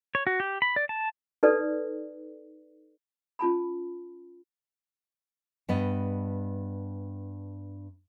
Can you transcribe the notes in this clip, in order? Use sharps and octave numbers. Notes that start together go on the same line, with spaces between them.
C#5
F#4
G4
B5
D5
A5
D#4 A4 B4 D5
C#4 F4 A5 B5
G2 B3 D#5